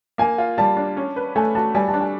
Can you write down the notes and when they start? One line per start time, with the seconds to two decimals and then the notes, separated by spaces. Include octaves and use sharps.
0.18 A#3 G#5
0.38 F4
0.58 G3 A5
0.77 D4
0.97 C#4
1.16 B4
1.36 A3 G#5
1.55 F#4 A5
1.75 G3 G#5
1.88 A5
1.94 D4
2.01 G#5